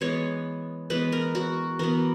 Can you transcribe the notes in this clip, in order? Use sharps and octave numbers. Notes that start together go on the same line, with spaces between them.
E3 G#3 B3 C#5
E3 G#3 B3 B4
A#4
F#4
E3 B3 A#4